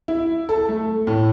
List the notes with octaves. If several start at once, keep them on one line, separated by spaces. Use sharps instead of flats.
E4
A4
A3
A2